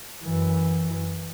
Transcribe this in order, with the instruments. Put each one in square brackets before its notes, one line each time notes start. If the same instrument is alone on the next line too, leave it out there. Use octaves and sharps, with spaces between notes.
[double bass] F#2 E3